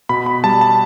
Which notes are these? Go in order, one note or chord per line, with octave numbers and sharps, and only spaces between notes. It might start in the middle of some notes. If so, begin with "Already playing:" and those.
B2 B5
B5
G3 A5
A5